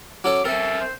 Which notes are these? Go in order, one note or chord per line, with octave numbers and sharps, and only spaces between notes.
F#3 C#4 A4 D6
C4 A4 A#4 E5
C5